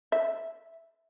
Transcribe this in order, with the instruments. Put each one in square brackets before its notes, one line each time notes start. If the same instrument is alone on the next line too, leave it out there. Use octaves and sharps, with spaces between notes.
[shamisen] E5